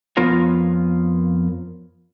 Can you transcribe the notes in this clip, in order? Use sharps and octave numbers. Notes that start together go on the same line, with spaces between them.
F2 F3 B3 F4 A#4 C#5